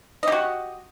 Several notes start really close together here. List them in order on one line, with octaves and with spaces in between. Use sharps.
D#5 G4 F#4